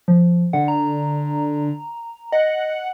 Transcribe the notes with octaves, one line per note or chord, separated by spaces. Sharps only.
F3
D3 F#5
A#5
D#5 F#5